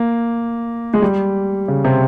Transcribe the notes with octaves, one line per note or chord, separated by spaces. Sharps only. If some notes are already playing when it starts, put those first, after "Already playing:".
Already playing: A#3
G#3
G3
C#3
C3